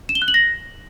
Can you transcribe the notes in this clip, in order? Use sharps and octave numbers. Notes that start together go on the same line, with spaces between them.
E7
G7
F#6
F#7
A#6